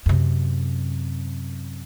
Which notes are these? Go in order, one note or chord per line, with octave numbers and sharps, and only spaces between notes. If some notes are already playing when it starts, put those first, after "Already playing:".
F#2 C3